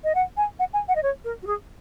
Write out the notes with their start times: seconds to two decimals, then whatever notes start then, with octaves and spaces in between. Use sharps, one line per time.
0.04 D#5
0.15 F#5
0.37 G#5
0.59 F#5
0.73 G#5
0.88 F#5
0.96 D#5
1.03 C#5
1.25 A#4
1.42 F#4
1.47 G#4